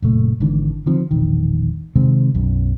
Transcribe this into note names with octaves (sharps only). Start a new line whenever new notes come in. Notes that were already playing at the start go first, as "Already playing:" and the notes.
F#1 A#2 A3
G#1 G#2 D3 E3
D3 D#3 F3 C4
E1 A#1 D#3
C3 D#3 G#3 C4
B1 F#2